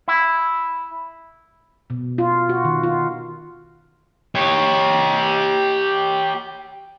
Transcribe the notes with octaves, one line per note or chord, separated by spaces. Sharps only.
E4
B2
F4
F#4
D#3
F4
G4 C#5